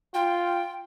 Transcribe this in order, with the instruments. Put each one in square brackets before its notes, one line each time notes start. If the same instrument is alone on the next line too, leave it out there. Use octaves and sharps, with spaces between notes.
[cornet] F4 [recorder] G5